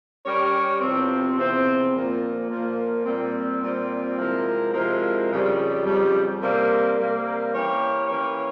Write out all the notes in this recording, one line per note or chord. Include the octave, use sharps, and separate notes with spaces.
G3 C#4 G4 A#4 C#5
E2 C3 F3 C4
E2 C3 F3 C4
A#2 F3 A#3
A#2 F3 A#3
A#2 G3 C4
A#2 G3 C4
C3 F3 G#3 E4 A#4
C3 F3 G#3 E4 A#4
F2 C#3 G3
F2 C#3 G3
C3 G3 A#3
C3 G3 A#3
E3 A#3 C#4 G4 C#5
E3 A#3 C#4 G4 C#5